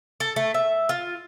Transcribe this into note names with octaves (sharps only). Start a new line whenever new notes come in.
A4
A3
E5
F4